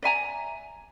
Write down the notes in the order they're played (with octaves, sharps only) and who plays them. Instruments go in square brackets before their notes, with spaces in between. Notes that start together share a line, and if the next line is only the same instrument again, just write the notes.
[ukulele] D5 E5 G#5 A#5